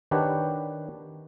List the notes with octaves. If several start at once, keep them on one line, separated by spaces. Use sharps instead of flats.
D#3 D4 G4 B4 C#5 F#5